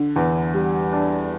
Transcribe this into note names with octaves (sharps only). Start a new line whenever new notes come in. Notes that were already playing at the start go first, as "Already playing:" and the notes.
Already playing: D3
E2
G3
D4